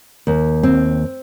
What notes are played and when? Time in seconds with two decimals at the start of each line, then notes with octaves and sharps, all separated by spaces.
0.27 D#2
0.63 C4